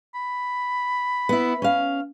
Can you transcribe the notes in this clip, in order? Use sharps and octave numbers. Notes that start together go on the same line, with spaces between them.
B5
B3 E4
C#4 F5